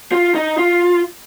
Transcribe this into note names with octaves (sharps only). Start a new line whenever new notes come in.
F4
D#4
F4